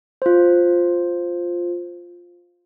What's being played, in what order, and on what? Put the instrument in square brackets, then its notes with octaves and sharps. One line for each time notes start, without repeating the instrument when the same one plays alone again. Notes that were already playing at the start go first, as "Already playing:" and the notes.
[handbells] F4 C5